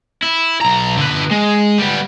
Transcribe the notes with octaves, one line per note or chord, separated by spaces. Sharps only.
E4
B1 A#5
D3 B4
G#3
G3 B3